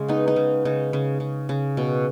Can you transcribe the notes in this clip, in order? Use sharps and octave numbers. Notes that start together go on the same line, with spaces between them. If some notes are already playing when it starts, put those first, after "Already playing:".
Already playing: C#3 G#3
B3 D#4
D#4
C#3
C#3 D#4
C#3
C#3
C#3
B2